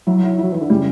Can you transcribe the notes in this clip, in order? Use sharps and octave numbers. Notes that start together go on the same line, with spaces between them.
F#3 E4
E4
F#3 E4
E3 E4
D3
C#3 G3